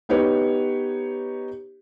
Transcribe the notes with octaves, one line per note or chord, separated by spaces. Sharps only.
B3 D#4 G4 B4 C#5